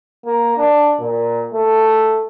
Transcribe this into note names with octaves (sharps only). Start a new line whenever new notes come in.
A#3
D4
A#2
A3